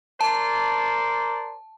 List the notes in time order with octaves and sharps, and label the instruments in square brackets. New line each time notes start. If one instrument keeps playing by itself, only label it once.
[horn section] A#4 C5 D5 [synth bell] A5